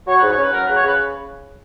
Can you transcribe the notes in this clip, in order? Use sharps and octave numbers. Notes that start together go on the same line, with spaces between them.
F#3 C#5
G#2 B4
C#5
C#4 B4
F#3 A#4
C#3 B4
C#5
C#3 B4